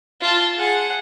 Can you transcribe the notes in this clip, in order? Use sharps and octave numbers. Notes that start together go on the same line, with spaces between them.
F4 A5
G#4 F#5